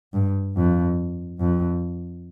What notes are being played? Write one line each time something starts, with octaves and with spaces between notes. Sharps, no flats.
G2
F2
F2